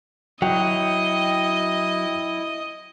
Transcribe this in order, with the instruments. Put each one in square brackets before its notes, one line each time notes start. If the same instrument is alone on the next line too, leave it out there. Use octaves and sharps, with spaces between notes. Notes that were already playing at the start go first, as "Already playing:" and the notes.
[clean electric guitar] F#3 [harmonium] E4 [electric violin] D#5 [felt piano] G5